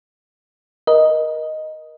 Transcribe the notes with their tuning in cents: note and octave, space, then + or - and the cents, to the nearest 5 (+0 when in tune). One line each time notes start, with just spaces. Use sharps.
A#4 +25 D#5 +0